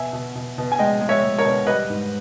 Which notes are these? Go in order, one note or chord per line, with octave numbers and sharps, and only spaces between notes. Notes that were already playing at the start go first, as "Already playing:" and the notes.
Already playing: B2 E5 G#5
B2
B2
B2
G#5
G#3 D#5 G5
G#3
C#5 E5
G#3
A#4 C#5
B2
G3 B4 D#5
G#2